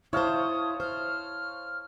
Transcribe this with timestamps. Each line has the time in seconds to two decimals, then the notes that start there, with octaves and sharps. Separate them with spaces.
0.13 E4 C5 C#5 F5 A5 D#6
0.80 C5 F6